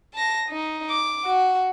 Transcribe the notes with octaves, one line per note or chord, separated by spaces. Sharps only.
A5 A#6
D#4
D6
F#4